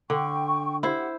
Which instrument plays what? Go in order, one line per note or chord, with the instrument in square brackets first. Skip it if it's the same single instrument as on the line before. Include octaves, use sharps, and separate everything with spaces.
[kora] D3 [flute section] G5 C#6
[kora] E4 C5 [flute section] G4 F#5